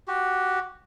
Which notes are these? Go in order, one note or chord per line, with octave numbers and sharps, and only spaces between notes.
F#4 G4